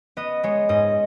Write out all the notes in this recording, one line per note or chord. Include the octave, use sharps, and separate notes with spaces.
B3 D#5
G#3 C#5
G#2 D#5